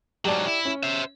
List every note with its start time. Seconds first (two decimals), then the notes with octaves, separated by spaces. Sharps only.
0.25 G#2 F#3 G4 D5 A5
0.47 E4
0.65 C#4
0.83 C5 E5